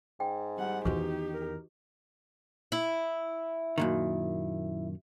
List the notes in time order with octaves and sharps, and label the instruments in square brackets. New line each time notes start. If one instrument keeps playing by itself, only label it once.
[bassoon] G#2 [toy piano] G5
[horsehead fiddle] G3 F#5
[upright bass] E2 D#3 [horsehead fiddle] D#4 G4 [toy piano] F#4 B4 C#6
[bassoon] A#4
[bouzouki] E4
[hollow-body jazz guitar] F#2 A#2 D#3